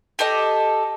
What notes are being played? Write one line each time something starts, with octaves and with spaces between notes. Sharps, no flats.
G4 A4 D#5